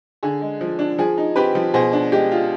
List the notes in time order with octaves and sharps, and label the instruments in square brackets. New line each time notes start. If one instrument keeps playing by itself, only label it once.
[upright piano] D3 G#4
G#3
F3
D4
F3 G#4
D#4
C4 G4 B4
F3
B2 G#4 C5
D4
G#3 G4
F4